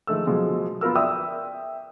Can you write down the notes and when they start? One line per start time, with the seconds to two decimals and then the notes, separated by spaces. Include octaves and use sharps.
0.07 D#3 F3 G#3 A3 E6
0.26 B2 F3 F#3 G#3
0.81 B3 F4 A#4 E6
0.96 D5 E5 G5 D#6 E6